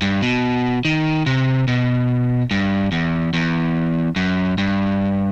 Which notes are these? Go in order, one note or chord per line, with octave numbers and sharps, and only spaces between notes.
G2
B2
D#3
C3
B2
G2
E2
E2
F#2
G2